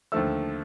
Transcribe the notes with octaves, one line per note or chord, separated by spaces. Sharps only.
D#2 D3 F3 A3 E6